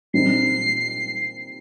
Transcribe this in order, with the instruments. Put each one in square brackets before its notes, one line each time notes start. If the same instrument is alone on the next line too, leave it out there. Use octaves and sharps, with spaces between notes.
[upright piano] A#2 G3 C4 D#4 [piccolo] C7
[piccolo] C7